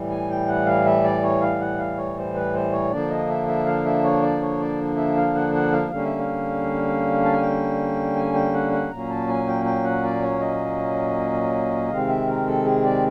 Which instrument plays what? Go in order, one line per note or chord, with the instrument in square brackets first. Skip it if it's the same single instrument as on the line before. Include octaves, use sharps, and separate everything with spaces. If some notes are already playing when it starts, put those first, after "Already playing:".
Already playing: [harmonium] A2 E3 G3
G#5
G5
F#5
F5
E5
D5
C#5
F5
F#5
F5
C#5
C5
B4
C5
C#5
D3 F3 A#3 D4 D5
D#5
E5
E5
F5
E5
C#5
D5
C#5
D5
E5
F5
F#5
F#5
F5
D3 G3 A#3 C#4 F5
E5
F5
A5
G#5
G5
G#5
G5
F#5
F#5
A#2 F#3 A#3 C#4 A#5
A5
G#5
G5
G5
F#5
D5
C#5
D#5
C3 D#3 G#3 C4 F5
E5
A#4
A4
G#4
D5